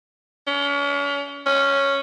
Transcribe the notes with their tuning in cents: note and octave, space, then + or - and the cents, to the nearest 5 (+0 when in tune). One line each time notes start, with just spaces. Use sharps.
C#4 +40
C#4 +0